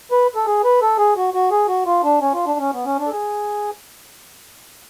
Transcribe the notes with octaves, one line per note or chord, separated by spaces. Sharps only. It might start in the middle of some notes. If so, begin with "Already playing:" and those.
B4
A4
G#4
B4
A4
G#4
F#4
F#4
G#4
F#4
F4
D4
C#4
F4
D4
C#4
B3
C#4
D4
A4
G#4